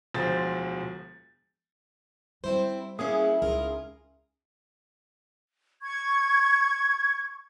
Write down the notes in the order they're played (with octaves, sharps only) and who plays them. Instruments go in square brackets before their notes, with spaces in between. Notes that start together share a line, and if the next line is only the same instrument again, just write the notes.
[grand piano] E1 D2 F3 C5 A6
[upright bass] G3 [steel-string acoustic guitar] C4 E4 C5
[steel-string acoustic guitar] A#3 B3 C#4 [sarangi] E4 [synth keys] G#4
[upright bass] C#2 D#4 [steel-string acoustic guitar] F4 A#4
[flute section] C#6 G#6